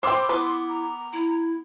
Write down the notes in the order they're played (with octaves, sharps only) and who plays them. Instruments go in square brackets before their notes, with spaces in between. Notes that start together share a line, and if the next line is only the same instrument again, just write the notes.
[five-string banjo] C5 G5 [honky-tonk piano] B5 D6 E6 [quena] C6
[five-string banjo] B3 B4 [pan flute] E4
[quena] A#5
[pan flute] E4